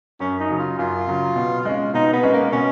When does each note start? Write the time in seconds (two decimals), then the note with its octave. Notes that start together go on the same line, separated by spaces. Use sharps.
0.20 F#2 C#4
0.40 D#4
0.49 C#3 F#3
0.59 F4
0.78 F#2 F4
1.07 C#3 F#3
1.36 B2
1.65 G#3 C#4
1.94 B2 D#4
2.13 B3
2.23 G#3 C#4
2.33 A#3
2.52 B2 C#4